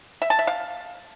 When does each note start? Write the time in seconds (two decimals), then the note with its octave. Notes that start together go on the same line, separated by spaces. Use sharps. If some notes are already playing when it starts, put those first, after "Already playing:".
0.22 E5
0.30 A5
0.39 E5
0.47 F5